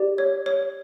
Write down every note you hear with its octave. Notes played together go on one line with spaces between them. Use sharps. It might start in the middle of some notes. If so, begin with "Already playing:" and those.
Already playing: G4 D5
C#5
C#5